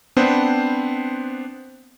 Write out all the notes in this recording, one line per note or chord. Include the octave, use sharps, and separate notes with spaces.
B3 C4 D4 B4 C5